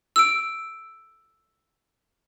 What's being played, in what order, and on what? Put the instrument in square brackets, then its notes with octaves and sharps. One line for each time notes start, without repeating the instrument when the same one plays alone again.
[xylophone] E6 D7